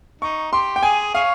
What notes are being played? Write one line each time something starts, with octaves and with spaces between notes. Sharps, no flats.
D#4 C#6
G4 C6
G5
G#4 G#5
G#4 C#5 F5